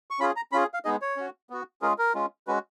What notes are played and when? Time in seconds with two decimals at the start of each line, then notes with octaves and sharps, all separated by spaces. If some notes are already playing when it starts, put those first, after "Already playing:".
0.11 C#6
0.19 C#4 F4 G#4 B5
0.36 A#5
0.52 C#4 F4 G#4 B5
0.74 F5
0.85 G#3 B3 D#4 G#4 D#5
1.02 C#5
1.17 C#4 F#4
1.50 B3 F#4
1.82 G#3 C#4 F4 G#4 A#4
1.98 A#4
2.15 G#3 C#4 F4
2.47 G#3 C#4 F#4 B4